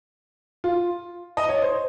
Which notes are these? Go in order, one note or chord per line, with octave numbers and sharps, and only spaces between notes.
F4
D#5
C#5
C5